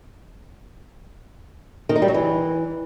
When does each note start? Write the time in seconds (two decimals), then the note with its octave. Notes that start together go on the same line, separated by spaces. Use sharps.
1.89 D#3
1.96 D#4
2.02 G3
2.08 F#3
2.14 E3